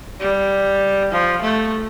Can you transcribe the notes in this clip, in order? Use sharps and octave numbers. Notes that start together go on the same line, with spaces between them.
G3
F3
A3